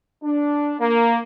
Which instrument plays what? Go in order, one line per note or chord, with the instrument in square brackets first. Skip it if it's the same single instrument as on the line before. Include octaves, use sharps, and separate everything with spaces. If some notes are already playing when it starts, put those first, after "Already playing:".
[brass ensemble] D4
A#3